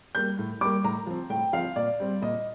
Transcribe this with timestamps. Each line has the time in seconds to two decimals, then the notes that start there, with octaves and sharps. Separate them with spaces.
0.15 G3 A#3 G6
0.39 A2
0.61 G3 A#3 D6
0.84 A2 A#5
1.07 F3 C4
1.30 A2 G5
1.53 F3 C4 F5
1.76 A#2 D5
2.00 G3 C4
2.22 A#2 D#5